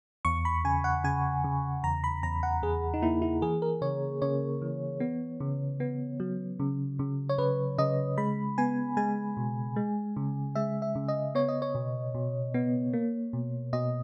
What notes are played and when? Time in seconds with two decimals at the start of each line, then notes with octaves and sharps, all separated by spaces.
0.25 E2 C#6
0.45 B5
0.64 C#3 G#5
0.84 F#5
1.04 C#3 G#5
1.44 C#3
1.83 E2 A#5
2.04 B5
2.23 E2 A#5
2.43 F#5
2.62 E2 G#4
2.94 D#4
3.02 A#3 E4
3.22 E4
3.42 E3 G#4
3.62 A#4
3.82 C#3 C#5
4.22 C#3 C#5
4.62 E3
5.00 B3
5.40 C#3
5.80 B3
6.20 F#3
6.60 C#3
6.99 C#3
7.29 C#5
7.38 C#3 B4
7.78 C#3 D#5
8.17 G#3 B5
8.58 B3 G#5
8.97 G#3 G#5
9.37 B2
9.76 G#3
10.16 C#3
10.55 G#3 E5
10.82 E5
10.95 C#3
11.08 D#5
11.35 B3 C#5
11.48 D#5
11.62 C#5
11.75 B2
12.14 B2
12.54 B3
12.93 A#3
13.33 B2
13.73 B2 D#5